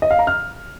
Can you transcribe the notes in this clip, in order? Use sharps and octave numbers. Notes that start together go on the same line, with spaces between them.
D#5
F5
A#5
F6